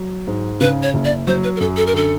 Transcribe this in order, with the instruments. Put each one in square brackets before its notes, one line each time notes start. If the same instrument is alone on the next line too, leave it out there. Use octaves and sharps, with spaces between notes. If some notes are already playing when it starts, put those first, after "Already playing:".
Already playing: [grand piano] F#3
G#2
[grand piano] C#3 [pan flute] B4
[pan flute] C#5
[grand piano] F#1
[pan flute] D5
[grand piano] F#3 [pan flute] C5
[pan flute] B4
A#4
[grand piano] F#2 [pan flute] A4
[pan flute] A4
A#4
[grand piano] D3 [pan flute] A4